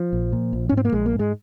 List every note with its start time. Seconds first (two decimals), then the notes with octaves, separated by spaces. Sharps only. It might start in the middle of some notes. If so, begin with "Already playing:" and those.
Already playing: F3
0.13 A#1
0.32 A#2
0.53 A#1
0.69 C#4
0.72 G#2
0.77 C4
0.85 A#3
0.92 A#1 G#3
1.06 A#3
1.13 G#2
1.19 G#3